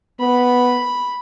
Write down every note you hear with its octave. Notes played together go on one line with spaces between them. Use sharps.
B3 B5